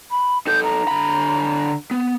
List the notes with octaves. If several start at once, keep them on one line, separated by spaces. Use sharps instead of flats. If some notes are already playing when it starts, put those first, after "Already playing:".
B5
D#4 A4 G6
A#5
D3 B5
B3